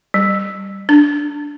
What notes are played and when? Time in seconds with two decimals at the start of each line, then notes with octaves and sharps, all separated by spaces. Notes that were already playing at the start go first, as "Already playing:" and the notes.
0.14 G3
0.89 D4